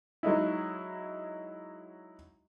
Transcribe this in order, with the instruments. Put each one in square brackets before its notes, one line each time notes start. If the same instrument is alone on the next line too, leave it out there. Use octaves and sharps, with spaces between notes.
[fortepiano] F#3 G#3 D#4 E4